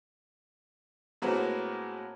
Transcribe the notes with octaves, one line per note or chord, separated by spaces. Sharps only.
A2 G#3 A#3 C4 F#4 B4